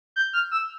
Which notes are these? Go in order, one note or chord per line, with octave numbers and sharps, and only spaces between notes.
G6
F6
E6